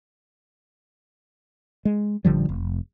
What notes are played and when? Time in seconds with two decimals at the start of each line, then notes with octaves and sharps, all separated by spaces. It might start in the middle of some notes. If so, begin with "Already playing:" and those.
1.85 G#3
2.25 A1 D3 F3 G3
2.49 F1